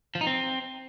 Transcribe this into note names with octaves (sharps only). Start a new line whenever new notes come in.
F3
D#4
C4